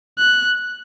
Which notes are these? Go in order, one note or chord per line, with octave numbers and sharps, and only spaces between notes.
F#6